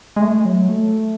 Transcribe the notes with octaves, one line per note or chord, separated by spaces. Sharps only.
G#3
A3
F#3
A3